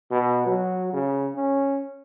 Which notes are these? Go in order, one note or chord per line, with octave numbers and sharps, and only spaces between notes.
B2
F#3
C#3
C#4